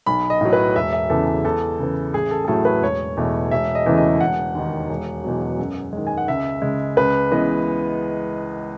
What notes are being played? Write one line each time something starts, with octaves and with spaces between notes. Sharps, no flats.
B1 B5
D#5
A2 F#3
B4
E1 E5
E5
E2 C#3 E3 A4
E2 A4
C#3 E3
A1 G#4
A4
G#4
A2 F#3 A3 A4
B4
E1 C#5
E2 B2 A3
E1 E5
D#5
E2 C#3 E3 A3
D#5
E1 F#5
D#2 D#3
E1
E2 B2 F#3
F#2
D#3 G#3
G#5
F#5
C#2 E5
C#3 G#3
C#2 B4
C#3 E3 G#3 B3 D#5